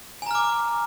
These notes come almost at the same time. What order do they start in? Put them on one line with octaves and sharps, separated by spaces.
G#5 A#5 F6 D6